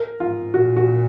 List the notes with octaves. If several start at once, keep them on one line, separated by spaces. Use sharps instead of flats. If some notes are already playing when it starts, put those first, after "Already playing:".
Already playing: A#4
G#2 F4
A#2 F#4
F#4